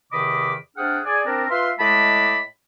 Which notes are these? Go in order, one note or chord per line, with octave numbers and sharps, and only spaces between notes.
E2 C3 D#3 D#5 B5 D6
C3 D4 G#4 F#5 G5 F6
G#4 D5 G#5
C4 D4 A#4
F4 B4 E5 F5 C6
A2 G#3 D#5 A5 B5 D6